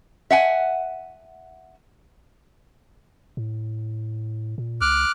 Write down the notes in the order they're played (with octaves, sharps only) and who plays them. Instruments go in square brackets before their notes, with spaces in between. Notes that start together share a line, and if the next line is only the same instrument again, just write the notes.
[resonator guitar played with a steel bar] E5 F#5 G#5
[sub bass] A2
A#2
[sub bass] C#2 [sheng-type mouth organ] D6 F6 F#6